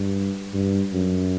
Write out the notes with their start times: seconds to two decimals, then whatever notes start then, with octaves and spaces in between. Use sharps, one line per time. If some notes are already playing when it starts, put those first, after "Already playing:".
Already playing: G2
0.54 G2
0.93 F#2